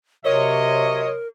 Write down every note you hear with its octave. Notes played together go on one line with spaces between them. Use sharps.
C3 F#3 A#4 C5 C#5 D#5